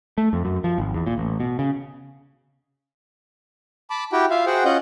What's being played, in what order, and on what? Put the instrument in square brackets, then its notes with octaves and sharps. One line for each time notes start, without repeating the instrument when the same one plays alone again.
[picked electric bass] A3
F2
F#2
F3
G#1
E2
A#2
A1
B2
C#3
[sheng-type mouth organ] A5 B5 D6
E4 F#4 G4 G5
F4 E5 F5
F#4 G#4 C5 F#5 G5
C#4 F4 D#5 F#5 G6